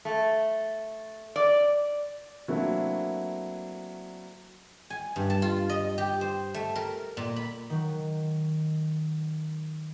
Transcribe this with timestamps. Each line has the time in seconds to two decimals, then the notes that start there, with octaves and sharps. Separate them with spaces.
0.05 A3
1.36 D5
2.48 F#3 A3 A#3 C4 D4 E4
4.90 G#5
5.16 G2
5.30 A5
5.42 F4
5.70 D#5
5.98 G4
6.21 C5
6.54 A3
6.75 A#4
7.17 A#2
7.36 B5
7.70 D#3 F#3